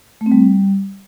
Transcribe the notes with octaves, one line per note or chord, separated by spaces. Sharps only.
A3
C4
G3